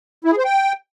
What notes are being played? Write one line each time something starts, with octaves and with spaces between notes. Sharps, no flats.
E4
G#4
C5
G5